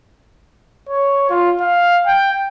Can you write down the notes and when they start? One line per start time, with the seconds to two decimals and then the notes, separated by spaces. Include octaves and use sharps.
0.89 C#5
1.30 F4
1.61 F5
2.07 G5